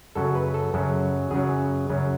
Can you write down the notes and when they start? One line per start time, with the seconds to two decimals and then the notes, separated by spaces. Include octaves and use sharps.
0.15 F#2 C#3 F#3 A4
0.35 B4
0.54 A4
0.74 F#2 C#3 F#3
1.31 F#2 C#3 F#3 G#4
1.90 F#2 C#3 F#3